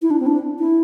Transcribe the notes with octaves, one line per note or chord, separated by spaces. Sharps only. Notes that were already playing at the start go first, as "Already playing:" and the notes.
E4
D4
C4
D4
E4